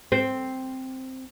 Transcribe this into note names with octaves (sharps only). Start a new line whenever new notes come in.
C4